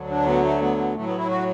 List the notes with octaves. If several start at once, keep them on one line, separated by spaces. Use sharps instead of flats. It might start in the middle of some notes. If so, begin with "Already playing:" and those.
Already playing: D2 D3 F#3
D4
B3
A3
B3
B3
A2 F#3 A3
B3
E4
F#4